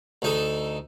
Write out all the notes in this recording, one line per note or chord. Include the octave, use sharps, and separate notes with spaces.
D2 D#4 A4